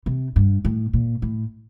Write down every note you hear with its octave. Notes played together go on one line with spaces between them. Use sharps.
C3
G2
A2
A#2
A2